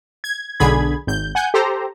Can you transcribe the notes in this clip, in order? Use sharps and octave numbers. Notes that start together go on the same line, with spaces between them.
G#6
B1 D3 G#4 B5 G#6
G#1 G6
F#5 G#5 G6
G4 A4 C5 A#5